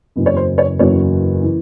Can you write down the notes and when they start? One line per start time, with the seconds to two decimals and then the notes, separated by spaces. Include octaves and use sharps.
0.16 F#1 E2 C#3 F#3
0.26 C#5
0.37 C5
0.58 C#5
0.79 F#1 E2 C#3 F#3 C#5
1.43 E3